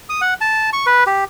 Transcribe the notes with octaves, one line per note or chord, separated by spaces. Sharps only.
D#6
F#5
A5
C#6
B4
G4